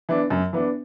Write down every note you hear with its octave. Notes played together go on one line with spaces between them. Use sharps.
E3 B3 D4
F#2
E3 B3 D4